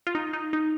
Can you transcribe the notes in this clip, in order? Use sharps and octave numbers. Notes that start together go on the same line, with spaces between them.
F4
D#4
D#4
D#4